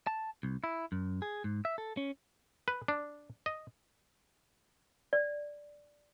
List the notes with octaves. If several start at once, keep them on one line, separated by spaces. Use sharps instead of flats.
A5
C2
E4
F#2
G#4
G#2
E5
A4
C#4
B4
D4
D#5
D5